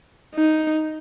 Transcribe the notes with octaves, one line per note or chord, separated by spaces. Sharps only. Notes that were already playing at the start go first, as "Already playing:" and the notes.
D#4